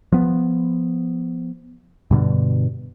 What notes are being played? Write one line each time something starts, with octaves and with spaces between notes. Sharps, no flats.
F3 B3
G2 B2 D3